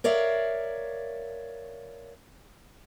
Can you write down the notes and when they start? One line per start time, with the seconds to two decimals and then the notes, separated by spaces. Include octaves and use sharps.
0.04 A#4 C#5 D5 E5 F5